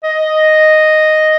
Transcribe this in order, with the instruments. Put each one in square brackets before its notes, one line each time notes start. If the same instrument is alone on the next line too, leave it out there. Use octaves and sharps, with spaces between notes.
[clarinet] D#5